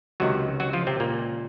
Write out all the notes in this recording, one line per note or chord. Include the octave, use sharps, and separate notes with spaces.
C#2 C3 D#3 F#3 F#4
F#3 F#4
F3 F4
C3 C4
A#2 A#3